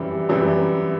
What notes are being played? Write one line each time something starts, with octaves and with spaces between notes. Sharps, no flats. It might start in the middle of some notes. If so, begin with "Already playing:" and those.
Already playing: F#2 E3 G3
F#2 E3 G3